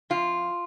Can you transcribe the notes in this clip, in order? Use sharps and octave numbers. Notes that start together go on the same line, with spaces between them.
F2 F4